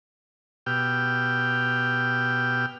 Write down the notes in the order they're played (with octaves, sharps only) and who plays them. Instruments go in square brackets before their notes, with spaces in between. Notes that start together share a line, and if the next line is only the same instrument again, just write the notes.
[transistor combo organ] B2 G4 G5 E6 F6